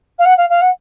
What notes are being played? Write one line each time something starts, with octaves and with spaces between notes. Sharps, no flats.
F5
F#5
F5
F5
F#5